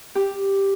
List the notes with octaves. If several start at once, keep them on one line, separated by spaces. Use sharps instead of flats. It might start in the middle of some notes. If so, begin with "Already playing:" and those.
G4